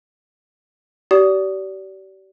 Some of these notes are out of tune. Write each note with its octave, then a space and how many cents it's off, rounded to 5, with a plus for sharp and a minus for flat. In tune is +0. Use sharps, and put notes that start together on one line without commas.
G4 -40 D5 -25 D#6 +0